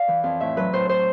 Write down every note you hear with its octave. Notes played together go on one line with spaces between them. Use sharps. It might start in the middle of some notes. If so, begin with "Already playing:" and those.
Already playing: D5 F5
E3
F2
A2 E5
F#3 B4
A2 C5
A2 C5